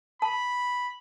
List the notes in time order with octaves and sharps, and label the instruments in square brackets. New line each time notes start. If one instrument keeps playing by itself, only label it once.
[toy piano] A5 [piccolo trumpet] B5